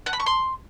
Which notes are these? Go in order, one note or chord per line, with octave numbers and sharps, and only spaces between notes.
F#5
B5
C#6
C6